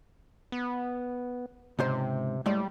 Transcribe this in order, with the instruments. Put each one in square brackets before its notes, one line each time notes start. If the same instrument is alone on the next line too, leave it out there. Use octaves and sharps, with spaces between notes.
[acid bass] B3
[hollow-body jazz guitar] C#2 G#2 C5 [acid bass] C3
[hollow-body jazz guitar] A2 G#3 D5 [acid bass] G3